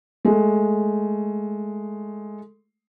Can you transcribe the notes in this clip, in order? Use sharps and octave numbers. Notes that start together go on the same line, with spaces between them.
G#3 A3